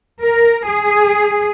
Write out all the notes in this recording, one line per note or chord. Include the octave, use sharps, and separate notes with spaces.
A#4
G#4